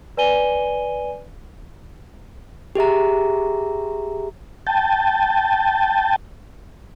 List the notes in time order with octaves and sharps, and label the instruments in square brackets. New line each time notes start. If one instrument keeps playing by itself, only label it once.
[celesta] B4 D5 G#5 D#7 G7
[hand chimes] G4 G#4 E5 A#5
[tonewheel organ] G5 A5